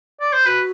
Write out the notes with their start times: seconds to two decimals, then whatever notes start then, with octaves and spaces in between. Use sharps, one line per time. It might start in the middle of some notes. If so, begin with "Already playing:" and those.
0.21 D5
0.33 C5
0.46 F#4 B4